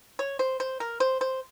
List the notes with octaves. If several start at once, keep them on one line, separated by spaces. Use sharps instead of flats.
C#5
C5
C5
A#4
C5
C5